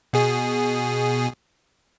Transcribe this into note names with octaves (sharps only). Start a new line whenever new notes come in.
B2 G#4